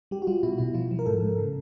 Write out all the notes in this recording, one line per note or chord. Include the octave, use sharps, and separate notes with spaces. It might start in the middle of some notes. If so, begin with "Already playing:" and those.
G3 G4
F#4
G3 F4
B2 E4
B2 E4
F3 F4
F3
A#4
G#2 A4
G#2
C#3